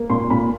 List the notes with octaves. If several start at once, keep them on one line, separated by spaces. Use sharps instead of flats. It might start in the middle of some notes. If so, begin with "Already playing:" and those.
Already playing: A#3
A#2 C6
A#2 B5